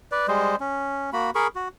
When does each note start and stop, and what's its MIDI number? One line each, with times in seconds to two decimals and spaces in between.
0.12 0.27 71
0.12 0.27 74
0.28 0.56 55
0.28 0.56 56
0.28 0.56 72
0.28 0.56 75
0.60 1.10 61
1.13 1.30 58
1.13 1.30 66
1.13 1.30 83
1.35 1.47 68
1.35 1.47 70
1.35 1.47 83
1.35 1.47 85
1.55 1.68 66